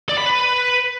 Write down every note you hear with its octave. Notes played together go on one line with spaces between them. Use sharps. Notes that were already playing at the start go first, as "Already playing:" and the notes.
D5
B5
B4